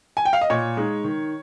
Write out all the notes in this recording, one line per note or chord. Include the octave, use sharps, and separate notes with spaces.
G#5
G5
F5
D#5
A#2 C#5
G#3 D#4
D#3